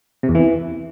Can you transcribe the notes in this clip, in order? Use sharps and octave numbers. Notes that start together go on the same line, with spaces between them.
C3
E2
E3